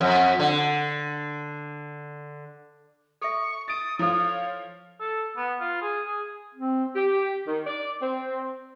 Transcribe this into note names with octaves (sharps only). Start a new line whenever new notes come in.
F2
D3
A4 E5 C#6
D#6 A6 D7
F3 E4 F4 A4 C#5
A4
B3
F4
G#4
G#4
C4
G4
D#3
D5
C4